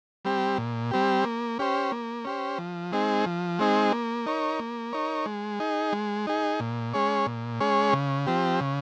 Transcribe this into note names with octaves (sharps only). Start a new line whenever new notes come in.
G3 C4 G4
A#2
G3 C4 G4
A#3
C#4 G4 C5
A#3
C#4 G4 C5
F3
G#3 C4 D#4 G#4
F3
G#3 C4 D#4 G#4
A#3
D#4 A#4 C#5
A#3
D#4 A#4 C#5
G#3
D#4 G#4
G#3
D#4 G#4
A#2
G#3 C#4 G#4 C#5
A#2
G#3 C#4 G#4 C#5
C#3
F3 C4 G4
C#3